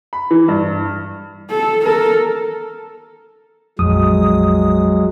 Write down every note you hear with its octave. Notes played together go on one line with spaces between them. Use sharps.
B5
E3
G2
A4
A4 A#4
A#1 F2 F#3 G#3 D#6